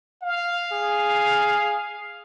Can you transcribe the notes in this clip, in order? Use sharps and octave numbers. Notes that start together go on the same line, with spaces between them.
F5
G#4